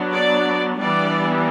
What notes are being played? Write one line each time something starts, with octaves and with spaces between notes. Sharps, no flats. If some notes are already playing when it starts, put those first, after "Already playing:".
Already playing: F#3 B3 D4
D5
E3 G3 B3 D4 D5